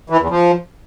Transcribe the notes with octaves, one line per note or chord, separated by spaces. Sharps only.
E3
E2
F3